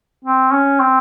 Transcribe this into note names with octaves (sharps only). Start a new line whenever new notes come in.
C4
C#4
C4